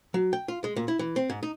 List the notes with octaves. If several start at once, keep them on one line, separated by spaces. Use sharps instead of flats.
F#3
G5
F4
G#3
A#2
E4
E3
C4
G#2
D#4